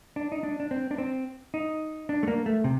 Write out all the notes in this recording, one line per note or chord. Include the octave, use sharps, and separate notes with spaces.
D4
D#4
D4
D4
C4
D4
C4
D#4
D4
A3
A#3
A3
C3